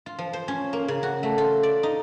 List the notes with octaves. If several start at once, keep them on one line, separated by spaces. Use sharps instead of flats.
F4
F3
C5
C#4
A#3
C#3
F#4
A3
F4
D5
D#4